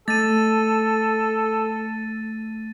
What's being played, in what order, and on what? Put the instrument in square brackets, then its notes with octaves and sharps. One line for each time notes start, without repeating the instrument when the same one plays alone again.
[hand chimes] A3 [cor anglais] A4 [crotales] A6 D#7